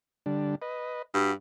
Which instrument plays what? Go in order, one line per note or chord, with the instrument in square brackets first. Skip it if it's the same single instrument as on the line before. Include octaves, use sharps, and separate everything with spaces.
[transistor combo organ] D3 G3 D4
B4 D#5
[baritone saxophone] G2 [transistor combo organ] F#4